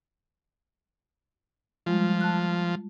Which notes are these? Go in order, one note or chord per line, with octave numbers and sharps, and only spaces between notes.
F3 G3 G#3 F4
A5 F#6